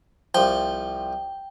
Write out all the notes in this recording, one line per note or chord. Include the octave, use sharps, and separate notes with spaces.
C2 F3 G5